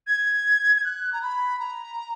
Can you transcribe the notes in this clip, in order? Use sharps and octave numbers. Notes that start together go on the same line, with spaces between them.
G#6
G#6
F#6
A#5
B5
A#5